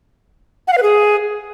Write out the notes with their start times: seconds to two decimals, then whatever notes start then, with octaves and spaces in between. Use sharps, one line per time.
0.67 F#5
0.72 F5
0.77 B4
0.82 G#4